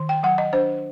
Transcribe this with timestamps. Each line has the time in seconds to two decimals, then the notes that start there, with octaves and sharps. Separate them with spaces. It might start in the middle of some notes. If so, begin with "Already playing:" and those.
Already playing: D#3
0.09 G5
0.23 F#3 F#5
0.38 D#5
0.53 D4 C5